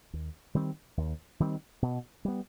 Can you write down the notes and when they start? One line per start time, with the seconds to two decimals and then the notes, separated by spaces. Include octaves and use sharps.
0.13 D#2
0.55 D#3 G3 C4
0.97 D#2
1.40 D#3 G3 C4
1.82 B2
2.25 G3 B3